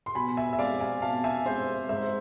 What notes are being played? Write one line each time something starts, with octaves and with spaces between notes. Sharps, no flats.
C6
B2 G#5 B5
E5 G#5
E5
G#3 C4 D5 F5
E5 G#5
B2 F5 A5
E5 G#5
G#3 C4 C5 E5
G#2 C5 E5